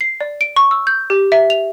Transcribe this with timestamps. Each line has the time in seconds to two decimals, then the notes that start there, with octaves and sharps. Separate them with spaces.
0.01 C7
0.21 D5
0.41 D7
0.56 C#6
0.71 E6
0.87 G6
1.10 G4
1.32 E5
1.50 F7